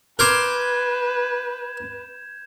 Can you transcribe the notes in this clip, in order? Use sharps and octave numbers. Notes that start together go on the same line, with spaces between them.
A#4 B4 C6 D6 G6 G#6 E7